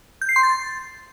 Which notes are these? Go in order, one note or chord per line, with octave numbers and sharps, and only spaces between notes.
G6
C7
C6
A6